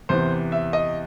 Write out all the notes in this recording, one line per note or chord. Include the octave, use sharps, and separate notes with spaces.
E2 C3 E3 C5
E5
D#5